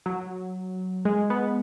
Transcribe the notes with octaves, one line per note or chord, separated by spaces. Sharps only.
F#3
G#3
B3